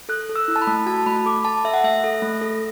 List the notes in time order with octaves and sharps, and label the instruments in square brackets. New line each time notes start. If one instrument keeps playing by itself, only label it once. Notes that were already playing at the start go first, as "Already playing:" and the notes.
[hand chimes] A4 F#6
A4
E6
E4
A5
B5
A3
F#4 A5
A3 B5
A4 D6
A4 A5
A4 E5
F#5
A3 E5
A4
A3
A4